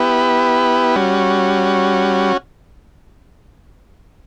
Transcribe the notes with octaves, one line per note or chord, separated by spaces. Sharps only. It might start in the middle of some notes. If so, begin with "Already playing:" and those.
Already playing: B3 E4 G4 B4
G3 C#4 F#4